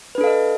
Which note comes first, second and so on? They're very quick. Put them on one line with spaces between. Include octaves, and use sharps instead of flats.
B4 D4 A4 F5 D#5